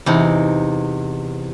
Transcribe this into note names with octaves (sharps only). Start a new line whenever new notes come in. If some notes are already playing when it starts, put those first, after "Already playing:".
E2 C3 D#4